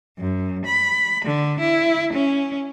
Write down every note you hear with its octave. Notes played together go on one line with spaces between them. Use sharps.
F#2
B5
D3
E4
C#4